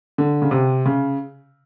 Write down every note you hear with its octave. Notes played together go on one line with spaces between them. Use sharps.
D3
C#3
C3
C#3